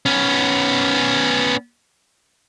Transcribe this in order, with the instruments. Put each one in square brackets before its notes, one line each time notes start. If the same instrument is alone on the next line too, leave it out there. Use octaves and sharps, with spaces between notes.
[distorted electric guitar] B3 C#4